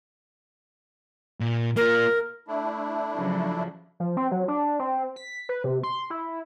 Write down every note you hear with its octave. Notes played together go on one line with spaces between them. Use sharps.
A#2
A#3 F4 A#4
A3 D4 E4
C#3 F3 F#3
F3
C4
F#3
D4
C4
B6
B4
C3
C6
E4